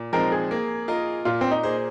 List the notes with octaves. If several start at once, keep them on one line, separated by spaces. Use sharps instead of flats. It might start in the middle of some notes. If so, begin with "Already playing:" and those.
Already playing: A#2
F3 G#3 C4 D#4 A#4
G#4
A#3
F4 A#4 D#5
A#2 F4
C4
D#4
A#3 G#4 C5